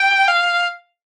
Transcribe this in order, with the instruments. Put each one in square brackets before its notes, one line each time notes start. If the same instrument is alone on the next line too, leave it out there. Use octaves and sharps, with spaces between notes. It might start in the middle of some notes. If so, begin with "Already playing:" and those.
Already playing: [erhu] G5
F5